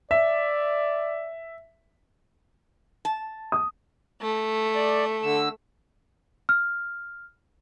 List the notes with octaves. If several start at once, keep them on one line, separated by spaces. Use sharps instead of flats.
D5 E5
A5
D#6
A3
D5
D3 E6
F6